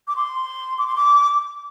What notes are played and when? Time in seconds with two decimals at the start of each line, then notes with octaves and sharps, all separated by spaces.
0.08 D6
0.16 C6
0.78 D6
0.87 C6
0.96 D6